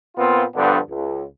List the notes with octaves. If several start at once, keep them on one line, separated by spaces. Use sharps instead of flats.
A#2 B3 C4 F4
G2 D3 F3 B3 D4
C#2